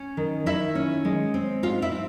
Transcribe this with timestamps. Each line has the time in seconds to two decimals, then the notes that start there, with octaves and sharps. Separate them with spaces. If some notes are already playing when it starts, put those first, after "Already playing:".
Already playing: C#4
0.17 D#3
0.46 D#3 E4 E5
0.75 C#4
1.05 G#3
1.34 C4
1.63 G#2 F4 F5
1.82 E4 E5
1.92 C4